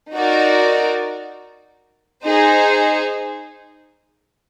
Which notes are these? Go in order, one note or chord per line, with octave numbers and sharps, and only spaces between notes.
D#4 F#4 A#4 D5
D#4 G#4 C5